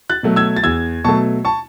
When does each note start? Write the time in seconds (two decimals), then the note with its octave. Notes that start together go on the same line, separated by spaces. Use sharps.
0.10 F#6 A6
0.23 B2 F#3 A3
0.36 E6 G#6
0.57 A6
0.63 E2 E6 G#6
1.04 B2 F#3 A3 A5 C#6
1.45 A5 C#6